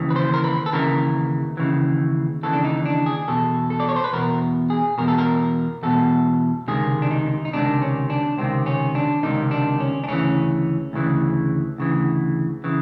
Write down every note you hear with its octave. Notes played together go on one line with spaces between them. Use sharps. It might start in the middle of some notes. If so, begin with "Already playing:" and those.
Already playing: D#2 C#3 E3
B4
C5
A#4
B4
A4
D#2 C#3 E3 A#4
D#2 C#3 E3
D#2 C#3 E3 A4
D4
D#4
D4
G#4
E2 B2 A4
A4
D5
C#5
C5
B4
E2 B2 A#4
G#4
E2 B2 A#4
A4
A#4
E2 B2 A4
C#2 C3 D#3 G#4
D4
D#4
D#4
C#2 C3 D#3 D4
C#4
D4
C#2 C3 D#3 C4
C#4
D4
C#2 C3 D#3 D#4
D4
C#4
D4
D2 C#3 E3 C#4
D2 C#3 E3
D2 C#3 E3
C#3 E3